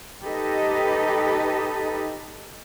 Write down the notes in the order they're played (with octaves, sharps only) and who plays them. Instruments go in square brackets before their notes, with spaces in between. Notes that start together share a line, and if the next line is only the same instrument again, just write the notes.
[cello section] D#4 G4 A4 B4 D#5